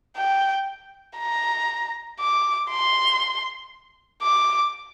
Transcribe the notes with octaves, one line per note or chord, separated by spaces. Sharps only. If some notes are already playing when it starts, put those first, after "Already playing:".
G5
A#5
D6
C6
D6